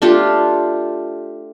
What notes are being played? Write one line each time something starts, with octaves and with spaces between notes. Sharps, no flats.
A3 D4 F4 G4